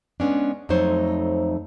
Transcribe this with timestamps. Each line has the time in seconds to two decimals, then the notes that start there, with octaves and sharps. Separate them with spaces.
0.20 G#3 B3 C#4 D4
0.69 F2 F#3 A3 D#4 C5 C#5